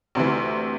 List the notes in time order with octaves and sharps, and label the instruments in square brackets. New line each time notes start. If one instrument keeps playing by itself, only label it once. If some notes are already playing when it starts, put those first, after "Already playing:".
[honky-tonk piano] D2 C3 E3